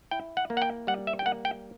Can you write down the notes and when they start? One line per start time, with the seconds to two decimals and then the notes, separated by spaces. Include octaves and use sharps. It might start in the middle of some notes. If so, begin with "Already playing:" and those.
0.11 E4 G5
0.37 F#5
0.50 A#3
0.57 F#5
0.62 G5
0.87 G3 F#5
1.07 E5
1.19 G5
1.26 A#3 F#5
1.45 G5